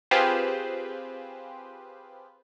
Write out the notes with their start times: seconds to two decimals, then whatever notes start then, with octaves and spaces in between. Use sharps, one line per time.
0.11 C4 F4 G4 G#4 B4 C5